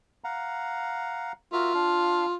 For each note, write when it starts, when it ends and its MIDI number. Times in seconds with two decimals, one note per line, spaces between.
0.24 1.32 77
0.24 1.32 78
0.24 1.32 82
1.53 2.35 65
1.53 1.73 66
1.53 1.73 70
1.53 1.73 76
1.74 2.26 62
1.74 2.26 77